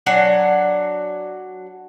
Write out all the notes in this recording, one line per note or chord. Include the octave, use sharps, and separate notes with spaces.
F#3 D4 F#5 G#5